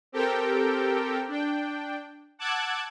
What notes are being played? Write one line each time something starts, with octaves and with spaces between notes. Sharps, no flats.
C4 G4 A4 A#4 G5
D4 G5
F#5 A5 D6 E6 F#6 G#6